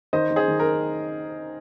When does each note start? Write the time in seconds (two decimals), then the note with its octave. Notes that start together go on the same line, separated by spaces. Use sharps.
0.13 D#3 C5 D#5
0.31 D#3
0.36 G#4 C5
0.48 D#3
0.60 A#4